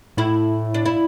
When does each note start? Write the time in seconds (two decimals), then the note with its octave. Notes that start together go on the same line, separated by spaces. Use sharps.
0.17 A2 E4
0.74 D4
0.86 E4